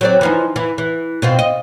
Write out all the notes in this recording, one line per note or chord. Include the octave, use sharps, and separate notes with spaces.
F#3 C4 D5
E3 F3 D#4
E3
E3
B2 C4 F4
D#5